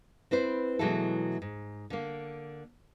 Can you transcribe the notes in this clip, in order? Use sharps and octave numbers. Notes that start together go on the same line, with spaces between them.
C4 E4 B4 C5
B2 E3 F#3 G#3 E4 A4
G#2
D3 A#3